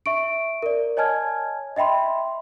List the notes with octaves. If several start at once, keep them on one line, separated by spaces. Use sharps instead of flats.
E5 C#6 D7
A#4 D5
C#5 D#5 G#5 A5 F6 G#6
D#5 E5 G5 B5 C6